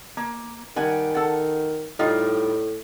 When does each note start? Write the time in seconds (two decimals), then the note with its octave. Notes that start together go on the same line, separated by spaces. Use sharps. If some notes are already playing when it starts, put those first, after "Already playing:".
0.17 A#3
0.76 D#3 G3 F#5 G#5
1.15 A4 F#5
1.99 A2 G3 D#4 F4